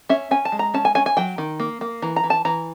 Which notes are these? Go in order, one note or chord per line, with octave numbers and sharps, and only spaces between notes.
C#4 E5
C#4 G#5
A5
G#3
A#5
C#4 A5
G#5
C#4 G#5
G#5
F#3 G5
D#3
A#3
A#3
E3 A#5
A#5
E3
A5
E3 A#5